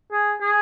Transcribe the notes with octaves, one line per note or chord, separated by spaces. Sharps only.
G#4
G#4